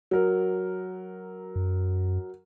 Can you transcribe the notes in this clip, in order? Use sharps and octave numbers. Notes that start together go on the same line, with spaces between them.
F#3 A#4
F#2